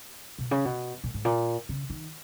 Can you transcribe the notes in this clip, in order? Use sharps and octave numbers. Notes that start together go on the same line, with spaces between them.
B2
C#3
B2
A#2
G#2
A#2
C#3
D#3